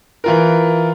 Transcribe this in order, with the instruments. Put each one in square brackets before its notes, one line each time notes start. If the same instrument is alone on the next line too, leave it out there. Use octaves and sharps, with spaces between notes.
[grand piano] E3 F4 A#4